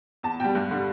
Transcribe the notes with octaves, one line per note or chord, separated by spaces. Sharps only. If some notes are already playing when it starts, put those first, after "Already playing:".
E2 A5
B2 G3 G5
G2
D3 G3